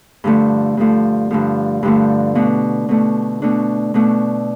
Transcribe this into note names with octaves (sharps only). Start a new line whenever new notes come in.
G2 D3 F3 A3
G2 D3 F3 A3
G2 D3 F3 A3
G2 D3 F3 A3
B2 A3 D4
B2 A3 D4
B2 A3 D4
B2 A3 D4